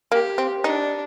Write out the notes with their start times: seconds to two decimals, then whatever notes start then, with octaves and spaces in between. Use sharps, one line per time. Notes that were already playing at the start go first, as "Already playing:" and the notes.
0.12 A#3 G4
0.38 C4
0.64 D4 D#4